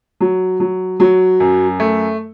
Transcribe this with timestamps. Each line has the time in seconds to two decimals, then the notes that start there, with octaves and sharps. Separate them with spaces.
0.20 F#3
0.60 F#3
1.00 F#3
1.40 F#2
1.80 A3